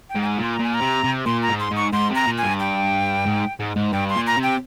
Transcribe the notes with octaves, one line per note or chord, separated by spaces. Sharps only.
G5
G#2
G5
G#5
A#2 C6
A#5
A#2 G#5
A#5
C3
C3
A#2 C6
A#5
G#2
C6
G#2
C#6
G#2 C6
C3 A#5
A#2
G#5
G2
G5
G#2
G#2
G#2
G2 G5
C6
A#2
A#5
C3
G5